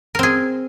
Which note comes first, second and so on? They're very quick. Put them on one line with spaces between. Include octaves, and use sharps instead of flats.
A#4 C4 G#4